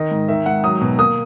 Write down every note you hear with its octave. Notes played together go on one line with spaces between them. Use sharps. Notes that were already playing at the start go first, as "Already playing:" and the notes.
Already playing: D#3 D#5
G#2
D#3 E5
G#2 F#5
F#3 D#6
B2
A#3 D#6